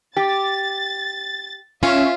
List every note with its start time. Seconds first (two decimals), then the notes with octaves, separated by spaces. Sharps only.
0.17 G4 A6
1.83 C#4 F4 E5